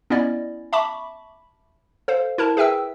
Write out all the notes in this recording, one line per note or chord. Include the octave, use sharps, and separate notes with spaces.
B3 C#4 E4 D5 D#5
E5 A5 B5 C#6 D6
A4 C5 F5
E4 A#4 A5
G#4 B4 E5 G5 E6